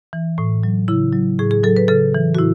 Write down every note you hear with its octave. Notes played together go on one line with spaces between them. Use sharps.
E3
A2
F#3
C#3 E4
F#3
A2 G#4
G#4
F#3 A4
B4
C#3 A4
E3
F#4
A2 E4